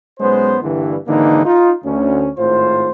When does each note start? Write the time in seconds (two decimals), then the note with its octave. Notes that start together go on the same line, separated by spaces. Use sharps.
0.20 B1 G#3 B3 C#4 C5
0.62 G2 D3 E3 G3 A#3 E4
1.07 G#1 D3 E3 A#3 D#4
1.45 D#4 F4
1.84 D2 C#4
2.37 G#1 A2 F4 C5